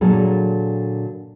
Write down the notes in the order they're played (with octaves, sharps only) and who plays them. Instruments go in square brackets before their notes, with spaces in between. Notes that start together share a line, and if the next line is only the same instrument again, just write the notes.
[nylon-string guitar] A#2 D3 F#3 G#4 A4